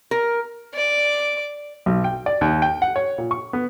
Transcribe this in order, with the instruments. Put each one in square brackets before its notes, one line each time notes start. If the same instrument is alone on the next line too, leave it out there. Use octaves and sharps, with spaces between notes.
[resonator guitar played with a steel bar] A#4
[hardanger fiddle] D5 D6
[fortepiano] B1
G5
D5
D#2
G5
F#5
C#5
A#2
C#6
B3